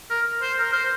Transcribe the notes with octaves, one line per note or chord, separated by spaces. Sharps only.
A#4
C5
A#4
C5